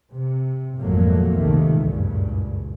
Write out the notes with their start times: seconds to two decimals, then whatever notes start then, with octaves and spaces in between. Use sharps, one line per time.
0.12 C3
0.81 G#1 F2 A#2 F#3 A3 A#3
1.39 C#2 C3 D#3 A3
1.81 F#1 C#2 G2 A#2 C#3